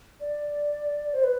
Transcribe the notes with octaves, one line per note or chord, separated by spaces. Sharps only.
D5
C5
B4